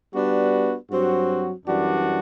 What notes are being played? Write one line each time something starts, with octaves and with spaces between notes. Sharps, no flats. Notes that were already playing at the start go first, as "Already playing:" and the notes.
G3 B3 D4 F#4 B4
G2 F#3 C4 F#4
F#2 E3 G3 D4 F#4